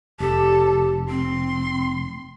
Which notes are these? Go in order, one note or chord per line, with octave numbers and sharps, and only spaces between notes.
F1 G4 A4
C4 C6